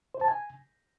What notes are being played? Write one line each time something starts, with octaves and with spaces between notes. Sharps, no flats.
C5
A5
G#5